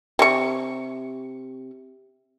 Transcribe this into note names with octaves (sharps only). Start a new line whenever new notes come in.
C3 C#6